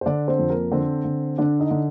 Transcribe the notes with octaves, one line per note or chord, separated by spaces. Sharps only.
C5
D3 D4 D5
C4 C5
F2
A#3 A#4
D3 C4 C5
D3
D3 D4 D5
D#4 D#5
D3